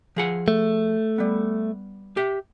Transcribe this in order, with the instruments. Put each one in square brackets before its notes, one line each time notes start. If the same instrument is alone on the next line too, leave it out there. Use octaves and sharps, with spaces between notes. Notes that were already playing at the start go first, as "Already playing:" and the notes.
[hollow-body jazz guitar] F3 G#4 F#5
[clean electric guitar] A3
[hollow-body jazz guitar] G3 B3
G4 E5